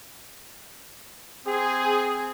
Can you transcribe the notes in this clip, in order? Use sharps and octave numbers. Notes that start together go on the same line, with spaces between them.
C4 G#4